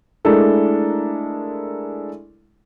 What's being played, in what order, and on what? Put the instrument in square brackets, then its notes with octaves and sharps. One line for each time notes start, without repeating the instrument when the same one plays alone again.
[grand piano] G#3 A3 D4 E4 A4 A#4